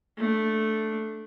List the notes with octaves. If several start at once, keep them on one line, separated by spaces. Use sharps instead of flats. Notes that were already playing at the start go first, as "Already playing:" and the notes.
A3 D4